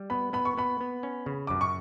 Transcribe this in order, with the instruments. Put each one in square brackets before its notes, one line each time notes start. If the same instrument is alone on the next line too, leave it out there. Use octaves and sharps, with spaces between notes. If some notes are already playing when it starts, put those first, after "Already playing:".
Already playing: [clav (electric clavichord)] G3
[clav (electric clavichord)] B3 [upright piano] B5
[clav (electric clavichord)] B3 [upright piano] B5
[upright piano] C#6
[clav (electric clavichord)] B3 [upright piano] B5
[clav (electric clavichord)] B3
C#4
C#3
[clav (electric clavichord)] F#2 [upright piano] D6
[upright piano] C#6